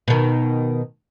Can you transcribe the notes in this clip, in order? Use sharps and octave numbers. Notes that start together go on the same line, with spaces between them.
B2 D#3